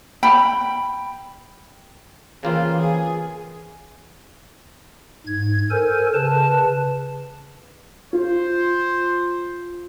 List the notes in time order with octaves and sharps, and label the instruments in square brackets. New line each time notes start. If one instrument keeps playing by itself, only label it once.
[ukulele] G5 B5
[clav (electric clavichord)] C#3 A#3 C4 [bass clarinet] E3 [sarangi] F4
[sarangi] G#4
[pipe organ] G#2 G#6
A4 A#4 C5 G#5
C#3 B4 A5
[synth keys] F4 [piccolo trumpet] C5